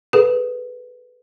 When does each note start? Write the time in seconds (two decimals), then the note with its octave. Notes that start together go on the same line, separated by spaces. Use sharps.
0.13 G#4 A4 B4